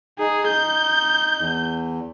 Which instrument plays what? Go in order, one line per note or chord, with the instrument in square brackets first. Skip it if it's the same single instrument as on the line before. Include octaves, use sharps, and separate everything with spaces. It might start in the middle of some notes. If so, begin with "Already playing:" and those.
[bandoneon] D#4 [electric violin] G#4
[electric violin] G6
[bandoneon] E2